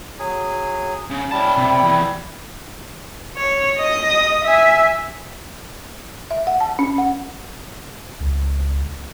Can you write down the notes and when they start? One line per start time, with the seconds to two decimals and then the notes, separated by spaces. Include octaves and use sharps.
0.19 F#3 G#4
1.10 C#3
1.31 G3 C#4 E4 A5
1.57 C3
1.83 E2
3.37 C#5
3.79 D#5 D#6
4.44 E5 G#5
6.31 E5
6.47 F#5
6.60 A5
6.79 C#4
6.98 F#5
8.20 C#2